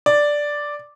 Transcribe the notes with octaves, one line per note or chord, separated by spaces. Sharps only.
D5